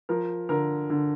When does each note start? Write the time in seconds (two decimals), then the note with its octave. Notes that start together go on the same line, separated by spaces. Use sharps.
0.09 F3 A#4
0.49 D3 A#4
0.90 D3